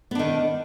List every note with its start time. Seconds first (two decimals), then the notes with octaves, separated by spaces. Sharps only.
0.11 B3
0.15 D4
0.19 D#3